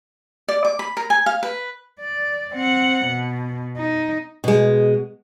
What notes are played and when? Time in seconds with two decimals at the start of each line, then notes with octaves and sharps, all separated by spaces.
0.48 D5
0.65 D6
0.79 B5
0.97 A#4
1.10 G#5
1.26 F5
1.43 B4
2.00 D5
2.53 C4 F#5
3.06 B2
3.77 D#4
4.44 B2 G#3